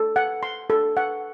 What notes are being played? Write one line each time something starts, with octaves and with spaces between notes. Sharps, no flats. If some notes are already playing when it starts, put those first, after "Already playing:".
Already playing: A4
F#5
C6
A4
F#5